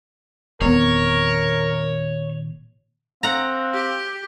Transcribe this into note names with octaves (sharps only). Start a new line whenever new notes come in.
E1 A#2 D#3 B3 C4 A#4 C#5
C4 F5 F#5 A#5
G4